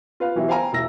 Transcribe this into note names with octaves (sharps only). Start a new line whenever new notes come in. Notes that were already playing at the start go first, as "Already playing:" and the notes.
F4 B4 F5
B2 E3 F#3 E4 G4
C5 F5 G5 G#5 A#5
E1 E4 E6 A#6